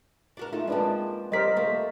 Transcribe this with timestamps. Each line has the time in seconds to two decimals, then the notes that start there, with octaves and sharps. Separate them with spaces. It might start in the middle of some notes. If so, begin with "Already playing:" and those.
0.37 D4 F#4 A#4
0.53 A3 D#4 F4 A4
0.68 F3 G#3 A#3 C4 D4 B4
1.32 G3 F4 A#4 C5 D5 D#5 B6
1.57 A3 A#3